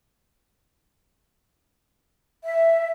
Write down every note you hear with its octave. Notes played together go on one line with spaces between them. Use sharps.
E5